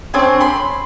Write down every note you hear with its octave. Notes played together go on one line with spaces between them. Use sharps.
C4 D4 C#5 G#5
B5 C6